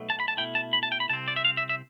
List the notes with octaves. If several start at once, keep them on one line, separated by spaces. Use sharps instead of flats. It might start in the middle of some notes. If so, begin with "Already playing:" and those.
Already playing: B1 B2 A3
A5
B5
A5
B2 A3 E4 G5
A5
B5
A5
G5
B5
C2 C3 C4 A5
D5
E5
F5
E5
E5